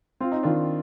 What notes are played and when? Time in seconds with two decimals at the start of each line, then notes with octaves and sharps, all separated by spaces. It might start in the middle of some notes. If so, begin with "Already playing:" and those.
0.20 C4 F4
0.32 D#4
0.43 D#3 D4 F4